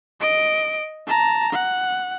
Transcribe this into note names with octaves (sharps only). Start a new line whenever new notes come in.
D#5 D7
A5 A#5
F#5